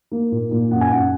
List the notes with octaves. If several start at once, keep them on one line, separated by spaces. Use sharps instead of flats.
A#3
A#2
A#2
F#2 F#5
G#5
F#2 F#5